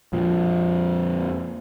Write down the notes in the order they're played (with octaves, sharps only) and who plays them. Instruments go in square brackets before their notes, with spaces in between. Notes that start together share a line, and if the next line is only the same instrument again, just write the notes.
[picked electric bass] F2 A#2 F3